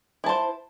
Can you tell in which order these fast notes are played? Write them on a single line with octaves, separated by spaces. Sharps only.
E4 A5 C5